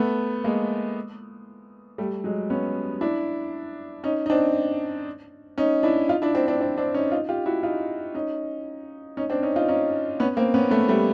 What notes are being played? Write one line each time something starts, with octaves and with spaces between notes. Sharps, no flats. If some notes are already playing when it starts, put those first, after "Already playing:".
Already playing: A3 B3
G#3 A#3
G3 A3
F#3 G#3
B3 C#4
D4 E4
C#4 D#4
D#4
C4 D4
C#4 D#4
D4 E4
D#4 F4
D4 E4
C4 D4
C4 D4
C4 D4
C4 D4
C#4 D#4
D#4 F4
F4 G4
E4 F#4
D#4 F4
C#4 D#4
C#4 D#4
C4 D4
C#4 D#4
D#4 F4
C#4 D#4
B3 C#4
A#3 C4
B3 C#4
A3 B3
G3 A3